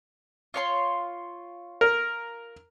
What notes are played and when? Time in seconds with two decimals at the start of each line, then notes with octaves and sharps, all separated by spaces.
0.54 F4 C#5 C6
1.81 A#4